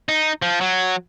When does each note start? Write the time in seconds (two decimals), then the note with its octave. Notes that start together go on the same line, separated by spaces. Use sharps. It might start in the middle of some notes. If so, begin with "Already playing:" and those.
0.09 D#4
0.42 F3
0.61 F#3